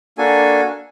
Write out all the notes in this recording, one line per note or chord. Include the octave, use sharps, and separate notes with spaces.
A#3 D4 F#4 A4 G#5